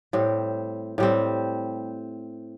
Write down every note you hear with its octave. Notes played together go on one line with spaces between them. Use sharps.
A2 G3 C4
A2 G3 C4